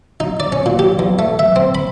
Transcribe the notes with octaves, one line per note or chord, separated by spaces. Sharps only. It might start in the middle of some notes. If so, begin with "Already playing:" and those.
D#4
D5
C#4
A#2
G4
E2
A3
E5
C4
B5